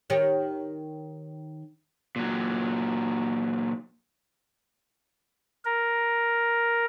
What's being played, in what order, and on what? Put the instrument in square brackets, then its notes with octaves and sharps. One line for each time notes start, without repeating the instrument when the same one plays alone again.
[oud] D#3 G4 C#5
[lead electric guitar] A#2 F#3
[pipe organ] A#4